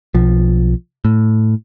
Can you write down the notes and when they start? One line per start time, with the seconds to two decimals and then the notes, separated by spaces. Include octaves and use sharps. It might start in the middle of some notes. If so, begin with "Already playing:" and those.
0.15 B1 F3
1.05 A2